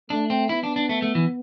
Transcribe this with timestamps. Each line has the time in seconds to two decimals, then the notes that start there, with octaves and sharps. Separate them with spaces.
0.10 A3 D4
0.30 C4
0.49 B3 E4
0.63 D4
0.76 D4
0.89 A3
1.02 A3
1.15 E3